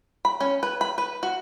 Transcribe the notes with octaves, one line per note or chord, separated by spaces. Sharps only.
B5
C#4
B4
B5
B4
F#4